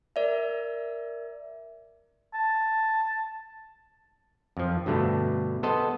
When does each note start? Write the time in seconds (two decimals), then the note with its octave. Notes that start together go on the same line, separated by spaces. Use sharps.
0.16 A#4 D5 E5
2.34 A5
4.57 F2 F3
4.86 G2 B2 D3 A3
5.63 B3 A4 C5 D#5 A5